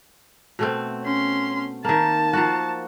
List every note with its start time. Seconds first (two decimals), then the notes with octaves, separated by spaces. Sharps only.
0.59 B2 A3 C4
1.03 C#4 C6
1.85 D#3 A#3 A5
2.33 F3 A#3 F#4